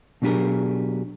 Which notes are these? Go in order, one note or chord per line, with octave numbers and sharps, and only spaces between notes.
B2 F#3 D4 G4 G#4 A#4